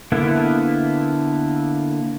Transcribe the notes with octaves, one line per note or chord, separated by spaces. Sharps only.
D3 A#3 B3 E4